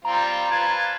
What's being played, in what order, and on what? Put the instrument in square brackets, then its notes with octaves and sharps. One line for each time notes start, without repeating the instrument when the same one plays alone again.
[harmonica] G3 C4 F4 [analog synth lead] A#5
[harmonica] F4 B4 A5 [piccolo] G#6